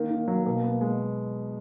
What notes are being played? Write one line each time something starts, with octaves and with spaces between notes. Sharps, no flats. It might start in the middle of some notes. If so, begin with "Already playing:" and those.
Already playing: D#3 A#3
D#3
F#3
B2 A#3
B3
G#3